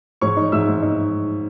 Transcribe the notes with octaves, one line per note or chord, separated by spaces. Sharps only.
G#2 C#5 C#6
D#4
G#2 E5 E6
G#2
D#4